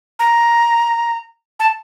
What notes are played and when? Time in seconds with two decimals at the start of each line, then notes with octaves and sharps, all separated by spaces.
0.19 A#5
1.60 A5